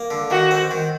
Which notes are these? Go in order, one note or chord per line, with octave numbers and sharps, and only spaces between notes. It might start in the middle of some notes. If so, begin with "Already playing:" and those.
Already playing: A#3
D3
D#3 F#4
C4
D#3